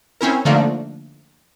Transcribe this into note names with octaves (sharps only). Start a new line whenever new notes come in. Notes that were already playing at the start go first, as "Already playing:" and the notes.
C4 C#4 E4 A#4
D3 F3 A3 A#3 D4 D#4